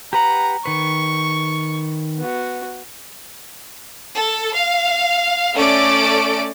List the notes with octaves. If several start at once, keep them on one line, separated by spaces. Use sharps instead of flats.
G4 B4 F#5 A#5
D#3 B4 C#6
B3 F#4
A4
F5
A3 C#4 A4 D5 D6 D7